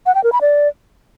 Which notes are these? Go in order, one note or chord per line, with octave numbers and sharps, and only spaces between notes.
F#5
G5
A#4
B5
D5